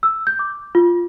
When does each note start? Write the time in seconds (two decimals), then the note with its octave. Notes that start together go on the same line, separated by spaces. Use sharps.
0.03 E6
0.27 G6
0.39 D6
0.75 F4